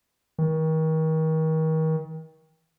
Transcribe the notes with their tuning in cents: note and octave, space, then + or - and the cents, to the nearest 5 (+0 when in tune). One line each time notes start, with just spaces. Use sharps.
D#3 +35